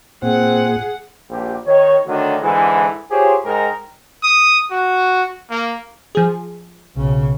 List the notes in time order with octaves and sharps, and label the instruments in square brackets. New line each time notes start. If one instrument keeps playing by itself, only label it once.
[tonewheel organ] A#2 [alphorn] C4 [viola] G#4 F#5
[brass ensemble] A#1 G4
D#3 C#5
D3 D#3 F#3 A3 D4
G#2 D3 E3
F4 G4 G#4 C5 C#5
G#2 D#4 A#4 G5 A#5
[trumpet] D#6
F#4
A#3
[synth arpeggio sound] F3 G#4
[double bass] B1 C#3